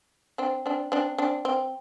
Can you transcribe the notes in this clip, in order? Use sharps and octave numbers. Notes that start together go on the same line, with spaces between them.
C4 D4
C4 D4
C4 D4
C4 D4
C4